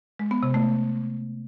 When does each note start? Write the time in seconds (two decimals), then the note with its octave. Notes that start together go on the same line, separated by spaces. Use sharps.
0.19 G#3
0.31 B3
0.43 C3
0.54 A3